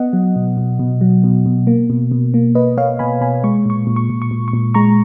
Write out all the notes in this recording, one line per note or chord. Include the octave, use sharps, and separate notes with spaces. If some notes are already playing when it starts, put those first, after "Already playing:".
Already playing: B3 D#5 F#5
F#3
B2
B2
B2
F#3
B2
B2
A#3
B2
B2
A#3
A#3 B4 D#5
A#3 C#5 F5
B2 G#5 B5
B2 G#5 B5
G#3 C#6
A#2 C#6
A#2
C#6
A#2
C#6
A#2
C#6
A#2
G#3 A#5 C#6